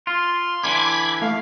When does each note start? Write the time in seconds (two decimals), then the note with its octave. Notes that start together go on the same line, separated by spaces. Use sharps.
0.07 F4 C6
0.64 D3 E3 B5 D6 G#6
1.22 A3 F5